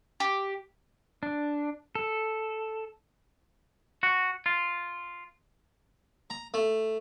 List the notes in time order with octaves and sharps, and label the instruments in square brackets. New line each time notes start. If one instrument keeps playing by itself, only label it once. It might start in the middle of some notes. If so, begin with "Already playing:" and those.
[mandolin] G4
[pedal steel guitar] D4
A4
[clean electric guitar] F#4
F4
[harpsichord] A#5
A3